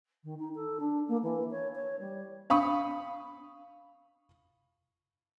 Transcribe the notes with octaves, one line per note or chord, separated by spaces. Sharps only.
D#3
D#4
A4
D4
A#3
E3
C#5
C#5
G3
F5 B5 C#6 D#6